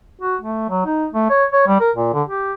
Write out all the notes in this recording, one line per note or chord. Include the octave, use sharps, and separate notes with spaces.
F#4
A3
F#3
D#4
A3
C#5
C#5
G3
A#4
A#2
D3
G4